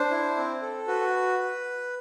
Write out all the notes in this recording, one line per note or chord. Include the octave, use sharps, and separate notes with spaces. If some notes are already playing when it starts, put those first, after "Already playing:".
Already playing: D4 C5
E4
C4
A4
F#4 B4